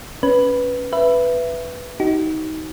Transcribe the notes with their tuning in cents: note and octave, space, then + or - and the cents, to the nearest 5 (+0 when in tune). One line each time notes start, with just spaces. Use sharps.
C#4 +0 B4 +0
B4 +0 E5 +20
D#4 +20 F#4 +45